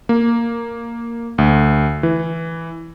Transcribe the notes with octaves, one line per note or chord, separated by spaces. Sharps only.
A#3
D2
E3